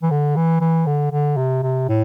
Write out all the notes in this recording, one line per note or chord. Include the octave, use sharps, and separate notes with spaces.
E3
D3
E3
E3
D3
D3
C3
C3
A2